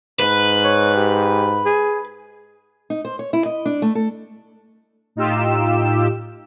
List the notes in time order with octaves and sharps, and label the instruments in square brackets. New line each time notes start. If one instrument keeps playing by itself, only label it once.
[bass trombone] G#2 [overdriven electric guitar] B4
[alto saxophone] C#5
G4
G#4
[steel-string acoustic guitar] D#4
C5
C#5
E4
D#5
D4
A3
A4
[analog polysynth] A2 D#4 F4 G4 E6